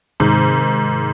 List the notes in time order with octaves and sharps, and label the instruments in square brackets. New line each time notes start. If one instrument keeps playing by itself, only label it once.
[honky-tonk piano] G#2 [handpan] C3 D#3 G#3